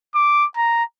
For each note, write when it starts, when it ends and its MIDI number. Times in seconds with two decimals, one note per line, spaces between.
0.15 0.46 86
0.57 0.84 82